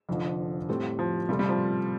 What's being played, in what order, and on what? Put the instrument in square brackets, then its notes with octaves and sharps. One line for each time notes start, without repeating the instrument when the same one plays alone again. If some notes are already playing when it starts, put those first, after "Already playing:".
[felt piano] F1 F2 D3 F3
A2 G3 C4 A4
[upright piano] F3
[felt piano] C3 A3 F4 A4 [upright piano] G3
[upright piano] G3
F3